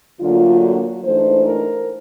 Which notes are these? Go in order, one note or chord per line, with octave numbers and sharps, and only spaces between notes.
D2 D3 F#3 A#3 F4
F#4
G#2 E3 A3 D4 C5
A#4